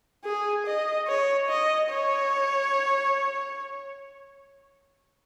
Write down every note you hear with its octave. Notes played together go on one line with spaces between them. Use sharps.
G#4
D#5
C#5
D#5
C#5